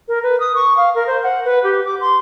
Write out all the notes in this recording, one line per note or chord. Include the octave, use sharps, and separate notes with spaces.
A#4
B4
D#6
C#6
F5
A#4
C5
F#5
B4
G4
D6
C6